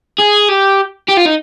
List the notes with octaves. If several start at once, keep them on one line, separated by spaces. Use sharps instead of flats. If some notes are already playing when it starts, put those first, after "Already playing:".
G#4
G4
G4
F4
D#4